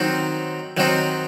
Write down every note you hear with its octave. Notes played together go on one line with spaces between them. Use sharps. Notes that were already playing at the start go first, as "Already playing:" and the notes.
Already playing: D#3 F#3 C4 D#4
D#3 F#3 C4 D#4